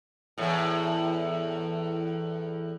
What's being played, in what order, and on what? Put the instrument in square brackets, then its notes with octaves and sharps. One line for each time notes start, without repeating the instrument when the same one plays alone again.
[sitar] E2 A2